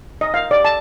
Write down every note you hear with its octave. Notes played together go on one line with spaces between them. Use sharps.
D#5
F5
D5
A5